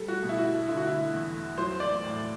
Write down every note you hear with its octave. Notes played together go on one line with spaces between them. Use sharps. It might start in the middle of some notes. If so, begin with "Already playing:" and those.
Already playing: G3 A4
F#4
B2
E4
F#4
D3 E4
F#4
E4
E2
F#3 C5
D5
A2